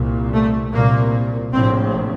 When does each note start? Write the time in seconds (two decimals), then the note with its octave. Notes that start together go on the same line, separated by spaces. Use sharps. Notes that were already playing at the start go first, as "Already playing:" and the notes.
Already playing: C2 A#2
0.33 A3
0.72 C2 A#2 A#3
1.52 A#1 A2 C4